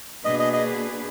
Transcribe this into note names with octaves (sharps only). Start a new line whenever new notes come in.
B2 A#3 D4 G#4 B4 D#5
D#5
D#5